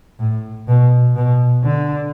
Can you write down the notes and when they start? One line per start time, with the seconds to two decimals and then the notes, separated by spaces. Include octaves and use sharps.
0.19 A2
0.68 B2
1.16 B2
1.64 D3